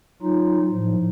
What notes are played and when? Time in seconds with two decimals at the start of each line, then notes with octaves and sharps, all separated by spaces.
0.22 F#3 D#4 F4
0.71 A2 F3